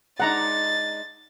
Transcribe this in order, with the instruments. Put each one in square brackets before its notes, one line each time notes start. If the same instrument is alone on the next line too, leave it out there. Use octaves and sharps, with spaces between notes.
[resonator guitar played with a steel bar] G#3 D4 D#4 [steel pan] F#5 A#5 [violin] A6